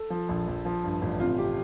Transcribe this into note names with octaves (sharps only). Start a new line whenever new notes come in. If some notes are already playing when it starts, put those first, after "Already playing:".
Already playing: A4
F3
A#1
A#1
F3
G2
A1
C3 F4
C3 G4